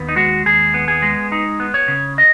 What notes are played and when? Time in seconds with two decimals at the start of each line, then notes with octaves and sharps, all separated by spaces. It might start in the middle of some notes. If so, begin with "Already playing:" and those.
Already playing: D#2 B3
0.09 D#4
0.16 G#3 F#4
0.46 D#2 G#4
0.74 B3
0.88 G#4
1.02 G#3
1.32 D#4
1.60 B3
1.74 C#5
1.88 C#3
2.18 D#5